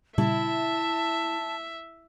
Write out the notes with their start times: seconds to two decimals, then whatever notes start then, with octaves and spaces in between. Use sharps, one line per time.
0.18 A#2 C#3 G3 E4 E5 A5